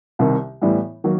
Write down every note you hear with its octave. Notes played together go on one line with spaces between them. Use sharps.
C2 C3 D#3
A2 E3 G3 B3
D#3 F#3 A#3